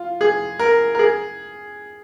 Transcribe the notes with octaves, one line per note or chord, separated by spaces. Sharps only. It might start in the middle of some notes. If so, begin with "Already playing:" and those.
Already playing: F4
G#4
A#4
A#4
G#4